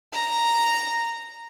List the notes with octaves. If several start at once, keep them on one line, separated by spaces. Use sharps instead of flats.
A#5